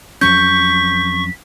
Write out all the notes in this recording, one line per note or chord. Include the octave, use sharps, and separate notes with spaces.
F2 F#3 C#4 C#6 G6 B6